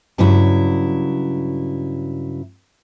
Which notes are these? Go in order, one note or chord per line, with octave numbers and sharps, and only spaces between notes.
G2 C#3 F#3 E4